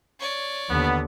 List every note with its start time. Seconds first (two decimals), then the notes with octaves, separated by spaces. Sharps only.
0.20 C#5 D5
0.69 D#2 D3 B3